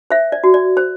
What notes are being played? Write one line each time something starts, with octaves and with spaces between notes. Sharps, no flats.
C5 E5
D5
F#4
D5
C5